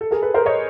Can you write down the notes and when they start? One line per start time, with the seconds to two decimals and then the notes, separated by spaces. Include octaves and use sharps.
0.01 A4
0.11 G#4 A#4
0.22 A4 B4
0.34 A#4 C5
0.46 C#5 D#5